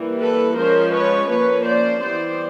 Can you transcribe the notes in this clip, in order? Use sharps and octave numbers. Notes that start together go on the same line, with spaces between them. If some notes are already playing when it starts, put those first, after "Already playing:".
Already playing: E3 G3 A#3
A4 B4
F3 G#3 C#4 A#4 C5
B4 C#5
F3 A#3 C#4 B4 C#5
C5 D5
E3 G3 B3 C5 D5